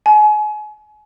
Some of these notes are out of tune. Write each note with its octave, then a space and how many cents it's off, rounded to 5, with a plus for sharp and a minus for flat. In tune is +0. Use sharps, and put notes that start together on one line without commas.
G#5 +35